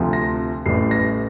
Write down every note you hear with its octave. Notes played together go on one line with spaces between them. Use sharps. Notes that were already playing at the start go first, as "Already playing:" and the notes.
Already playing: D2 C3 F3
A#6
A1 A2 G3 C7
A#6